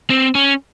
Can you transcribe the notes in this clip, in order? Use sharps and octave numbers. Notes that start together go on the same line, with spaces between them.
C4
C#4